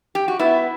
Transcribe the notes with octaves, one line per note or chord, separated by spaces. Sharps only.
G4
F#4
B3 E4